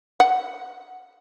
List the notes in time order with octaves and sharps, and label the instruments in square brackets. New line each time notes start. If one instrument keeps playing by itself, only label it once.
[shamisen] F#5